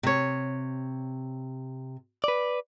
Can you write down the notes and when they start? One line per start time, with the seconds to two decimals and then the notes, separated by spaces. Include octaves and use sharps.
0.03 C3 C#5
2.24 B4 D5